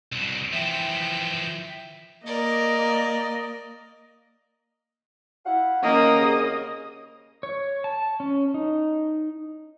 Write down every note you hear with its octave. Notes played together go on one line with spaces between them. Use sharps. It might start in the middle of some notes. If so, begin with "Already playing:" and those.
C2 B2
E3 F3 E5 G5
A#3 A#4 D5 D#5
E4 F5 F#5
D#3 A#3 C#4 D#5
C2 C#3
C#5
A5
C#4
D#4